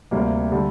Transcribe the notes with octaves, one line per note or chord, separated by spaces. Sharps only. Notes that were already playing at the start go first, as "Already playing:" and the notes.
D2 C3 G3 A#3
D3 G3